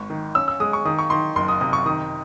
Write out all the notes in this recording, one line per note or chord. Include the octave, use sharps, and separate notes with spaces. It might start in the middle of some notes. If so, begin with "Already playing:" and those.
Already playing: G#1 C#6
D#3
C#4 E6
E6
G#3 D#6
C#6
D#3 D#6
C#6
D#3 C6
F#1 C6
D#6
C3 D#6
C#6
D#3 D#6